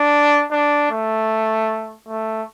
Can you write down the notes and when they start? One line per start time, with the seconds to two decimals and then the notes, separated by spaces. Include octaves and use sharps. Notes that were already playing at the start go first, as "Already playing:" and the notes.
Already playing: D4
0.52 D4
0.91 A3
2.08 A3